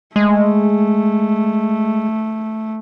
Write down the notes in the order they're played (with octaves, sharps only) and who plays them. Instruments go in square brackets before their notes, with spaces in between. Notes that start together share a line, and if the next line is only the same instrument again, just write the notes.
[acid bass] G#3 [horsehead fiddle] A3